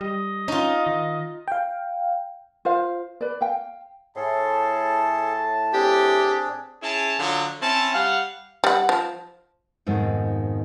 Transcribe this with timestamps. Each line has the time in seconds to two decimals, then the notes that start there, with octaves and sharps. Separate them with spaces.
0.01 G3 D#5
0.48 C#4 D#4 F4
0.87 D#3
1.48 F5 G5
2.65 F4 C5 F5
3.21 B4 D5
3.41 F5 G5
4.16 A2 G#4 A4 A5 C6
5.74 C4 D4 G4 G#4
6.82 C#4 E4 G#4 A5
7.18 D3 F3 F#3
7.60 C4 C#4 E4 A5
7.93 G3 F5 F#5
8.64 G3 F#5
8.89 F3
9.86 F2 G#2 B2 D#3